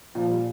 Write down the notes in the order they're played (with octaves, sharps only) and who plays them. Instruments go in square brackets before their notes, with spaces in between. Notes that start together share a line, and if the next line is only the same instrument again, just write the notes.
[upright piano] A#2 [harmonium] F3
[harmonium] G3